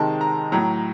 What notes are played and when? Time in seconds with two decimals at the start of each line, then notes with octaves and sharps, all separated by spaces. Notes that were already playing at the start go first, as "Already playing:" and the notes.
Already playing: C3 D#3 G#3 A5
0.21 A#5
0.52 A2 F#3 A#5